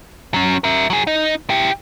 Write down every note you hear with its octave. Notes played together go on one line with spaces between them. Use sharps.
F#3 C#4
A#4 E5
F#3 G#4
D#4
E4 G4